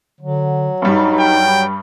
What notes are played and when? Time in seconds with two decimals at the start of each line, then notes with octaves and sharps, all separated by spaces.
0.21 D3 F#3
0.82 G2 G3 D#4
1.20 G5